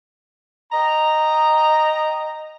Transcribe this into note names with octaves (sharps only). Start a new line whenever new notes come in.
D#5 G5 A#5